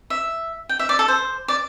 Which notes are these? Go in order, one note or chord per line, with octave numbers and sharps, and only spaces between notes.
E5
G5
E5
D5
A4
C5
D5